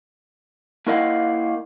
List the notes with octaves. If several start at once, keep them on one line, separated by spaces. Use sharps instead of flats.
A#3 E4 A#4 D#5 F5 F#5